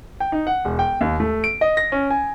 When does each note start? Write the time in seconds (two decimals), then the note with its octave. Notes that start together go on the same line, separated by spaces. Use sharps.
0.20 G5
0.32 D#4
0.47 F#5
0.65 E1
0.79 G5
1.01 D#2
1.20 A3
1.44 D7
1.61 D#5
1.77 A#6
1.92 C#4
2.11 G#5